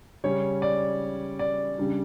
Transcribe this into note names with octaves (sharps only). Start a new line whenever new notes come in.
C#3 G3 C#4 C#5
D5
D5
C#3 G3 D4